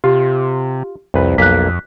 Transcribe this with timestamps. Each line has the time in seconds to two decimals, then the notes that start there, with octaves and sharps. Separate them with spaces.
0.04 C3 F4 G4
1.14 C2 F2 B4
1.38 B1 F2 A#3 F#6 B6